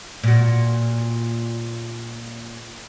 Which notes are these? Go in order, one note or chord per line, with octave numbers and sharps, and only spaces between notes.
A#2 F#4